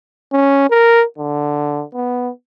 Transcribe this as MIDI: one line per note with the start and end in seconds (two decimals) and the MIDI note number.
0.32 0.65 61
0.70 1.04 70
1.18 1.83 50
1.94 2.30 59